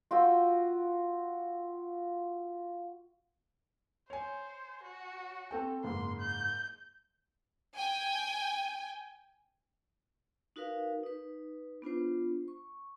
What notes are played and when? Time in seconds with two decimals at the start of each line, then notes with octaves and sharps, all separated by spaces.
0.11 F4 F#4 G5 E6
4.10 C5 C#5 G#5
4.83 F#4
5.51 C4 A4 G5
5.84 F#1 G#2 C6
6.20 G6
7.76 G5 G#5
10.56 D#4 F#4 A#4 B4 F5
11.03 D#4 B4
11.82 B3 D4 F4 C5
12.48 C#6